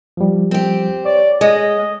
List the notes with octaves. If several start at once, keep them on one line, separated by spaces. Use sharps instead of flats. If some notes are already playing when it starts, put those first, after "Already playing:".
F3 G3
C4 G4
C#5 D5
G#3 D#5